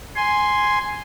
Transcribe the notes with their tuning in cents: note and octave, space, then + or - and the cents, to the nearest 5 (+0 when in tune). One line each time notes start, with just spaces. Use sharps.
G#5 +0 C6 +0